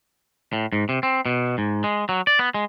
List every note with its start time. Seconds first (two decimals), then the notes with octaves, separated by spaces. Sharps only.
0.53 A2
0.73 G#2
0.89 C3
1.03 C4
1.26 B2
1.58 G#2
1.84 G#3
2.09 F#3
2.27 D5
2.39 B3
2.54 G#3